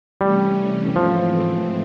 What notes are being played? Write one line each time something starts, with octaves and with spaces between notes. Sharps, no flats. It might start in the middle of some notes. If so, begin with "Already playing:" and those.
C3 E3 G3 A3 C#4
G#2 E3 F3 A3 C4